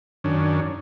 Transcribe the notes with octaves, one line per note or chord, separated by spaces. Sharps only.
F#2 D#3 C#4 D4